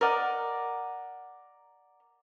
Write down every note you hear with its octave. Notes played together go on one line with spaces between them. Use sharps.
A#4 D5 D#5 F#5